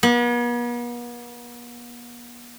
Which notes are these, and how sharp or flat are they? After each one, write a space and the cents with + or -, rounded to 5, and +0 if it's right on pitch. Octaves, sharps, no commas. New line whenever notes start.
B3 -45